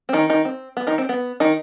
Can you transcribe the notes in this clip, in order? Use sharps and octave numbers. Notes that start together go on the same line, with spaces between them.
C4
D#3 D#4
D#3 D#4
C4
B3
D#3 D#4
C4
B3
D#3 D#4